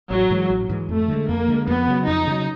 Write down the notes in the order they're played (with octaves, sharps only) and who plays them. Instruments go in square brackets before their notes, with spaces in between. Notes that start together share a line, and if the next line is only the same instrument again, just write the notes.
[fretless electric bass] A1 [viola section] F#3
[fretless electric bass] G#2 E3 G#3
A1
G#2 E3 G#3
[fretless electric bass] F2 [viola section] A3
[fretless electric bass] D3 F3 G#3
[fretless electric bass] F2 [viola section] A#3
[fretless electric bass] D3 F3 G#3
[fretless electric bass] F2 [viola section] B3
[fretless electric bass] C#3 F#3
[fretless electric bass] F2 [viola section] D#4
[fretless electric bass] C#3 F#3